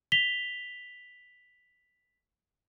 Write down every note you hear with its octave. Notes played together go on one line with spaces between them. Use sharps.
B6 F7 G7